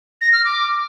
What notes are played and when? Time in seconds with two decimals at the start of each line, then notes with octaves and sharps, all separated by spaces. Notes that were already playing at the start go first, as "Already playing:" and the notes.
0.21 A#6
0.33 F6
0.45 D6